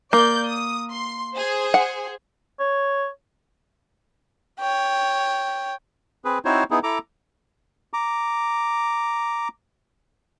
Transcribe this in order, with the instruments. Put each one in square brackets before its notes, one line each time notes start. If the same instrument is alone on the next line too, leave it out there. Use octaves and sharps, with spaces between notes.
[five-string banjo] A#3 [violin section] D5 G6
[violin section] D#6
C6
G#4 C5
[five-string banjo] F#5
[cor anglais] C#5
[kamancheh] C#5 G5
[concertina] C4 G#4 B4
C4 D#4 E4 F#4 C5 C#5
B3 D#4 E4 G#4
E4 A4 A#5 D6
A#5 D6